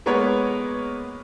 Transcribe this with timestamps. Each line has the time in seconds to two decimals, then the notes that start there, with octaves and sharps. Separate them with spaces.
0.06 G#3 A#3 B3 A#4 B4 C#5